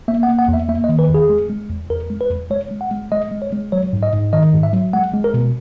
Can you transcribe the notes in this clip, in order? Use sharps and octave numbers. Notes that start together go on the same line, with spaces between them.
A#3 E5
F#5
A#3
F#5
E2
E5
A#3 E5
D#5
D#3
B4
E2 G#4
G#3
G#3
E2
E2 A#4
G#3
B4
E2
G#3 C#5
G#3
F#5
G#3
G#3 D#5
G#3
C#5
G#3
F#3 C#5
G#2
D#5
G#2
D#3 D#5
G#2
E5
F#3
G#3 F#5
G#3
A#4
B2